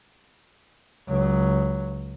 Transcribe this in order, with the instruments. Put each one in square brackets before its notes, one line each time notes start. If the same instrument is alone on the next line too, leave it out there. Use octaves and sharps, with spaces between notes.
[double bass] C#2 F#3